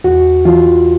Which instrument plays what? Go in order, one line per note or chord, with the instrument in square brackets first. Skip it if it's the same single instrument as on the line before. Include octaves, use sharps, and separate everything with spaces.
[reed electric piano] E2 F#4
E3 F4